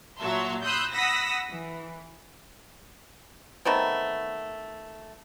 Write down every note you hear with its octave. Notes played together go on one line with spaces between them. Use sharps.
A#2 F#3 E5 A5 A#5 C6
B5 C6 D#6 E6 F#6 G6
F#5 B5 D#6 E6 A#6 B6
E3
D#3 A3 B3 C4